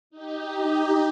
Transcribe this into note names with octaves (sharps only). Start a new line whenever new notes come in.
D#4 G4